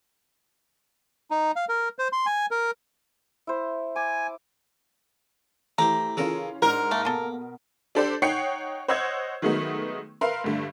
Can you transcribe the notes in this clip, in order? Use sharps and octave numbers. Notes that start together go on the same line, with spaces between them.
D#4
F5
A#4
C5
C6
G#5
A#4
E4 C5
G#5 D6
E3 A3 G4 C5 A#5
C#3 E3 C#4 F4 A4 A#4
G#2 D4 A#4 C5
A3 A#3
B2 G#4 A4
D4 G4 A4 C5 D5
D#4 C#5 F#5 G5 C7 C#7
C5 C#5 D#5 F#5 E6 G#6
D#3 F#3 G#3 A3 B3 D#4
A#4 B4 E5 F5 C6
G2 D3 A3